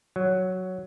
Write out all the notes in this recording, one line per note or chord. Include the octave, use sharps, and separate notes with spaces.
F#3